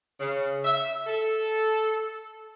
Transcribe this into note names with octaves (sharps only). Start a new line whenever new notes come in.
C#3
E5
A4